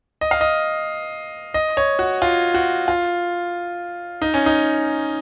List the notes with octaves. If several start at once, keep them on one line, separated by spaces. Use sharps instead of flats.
D#5
F5
D#5
D#5
C#5
F#4
F4
F#4
F4
D#4
C#4
D#4